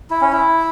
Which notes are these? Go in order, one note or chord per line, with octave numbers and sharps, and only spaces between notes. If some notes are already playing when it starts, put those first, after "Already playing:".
E4
C#4
E4